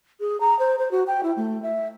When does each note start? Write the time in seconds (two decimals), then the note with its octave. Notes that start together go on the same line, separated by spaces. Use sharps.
0.20 G#4
0.40 A#5
0.59 C5
0.78 C5
0.91 F#4
1.07 G5
1.23 E4
1.36 A3
1.62 E5